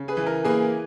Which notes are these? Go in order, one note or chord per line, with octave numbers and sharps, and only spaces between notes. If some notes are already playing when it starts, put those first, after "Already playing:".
Already playing: C#3
G#4 B4
E3
A#4
A#3 G#4 B4